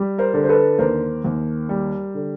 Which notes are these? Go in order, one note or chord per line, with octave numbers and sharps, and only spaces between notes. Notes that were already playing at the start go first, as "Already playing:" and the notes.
Already playing: G3
A#4 C5
D3
C5
A4 B4
D#2 A#4 C5
D#2
G3
D3